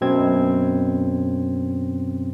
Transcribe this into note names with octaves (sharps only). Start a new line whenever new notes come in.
F#2 B2 C4 G#6